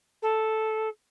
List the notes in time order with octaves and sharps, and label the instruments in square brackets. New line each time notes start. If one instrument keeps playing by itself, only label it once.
[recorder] A4